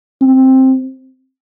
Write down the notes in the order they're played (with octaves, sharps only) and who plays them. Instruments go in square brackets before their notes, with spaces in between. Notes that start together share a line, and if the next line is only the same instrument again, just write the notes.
[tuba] C4